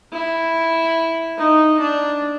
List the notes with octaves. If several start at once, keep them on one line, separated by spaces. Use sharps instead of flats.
E4
D#4
D4